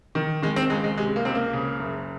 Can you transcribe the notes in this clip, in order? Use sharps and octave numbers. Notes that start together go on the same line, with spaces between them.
D#3
D#3 G#3
C4
C#2 G#3
G#3
C3 G#3
A#3
C#2 C4
A#3
C#3
F#1